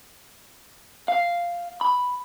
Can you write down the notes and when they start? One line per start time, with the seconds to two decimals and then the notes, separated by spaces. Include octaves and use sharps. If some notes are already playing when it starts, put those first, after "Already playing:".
1.08 F5
1.81 B5